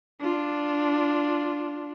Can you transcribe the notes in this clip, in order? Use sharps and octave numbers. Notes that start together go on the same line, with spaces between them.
D4 F4